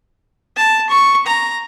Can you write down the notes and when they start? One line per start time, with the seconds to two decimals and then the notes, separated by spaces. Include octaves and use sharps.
0.56 A5
0.89 C#6
1.26 A#5